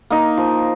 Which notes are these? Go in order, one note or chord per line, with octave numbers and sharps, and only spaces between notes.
A#3 D#4
F3